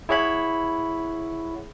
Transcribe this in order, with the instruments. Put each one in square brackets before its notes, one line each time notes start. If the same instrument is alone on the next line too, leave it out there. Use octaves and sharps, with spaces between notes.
[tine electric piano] E4 G#4 C#5 F#5 B5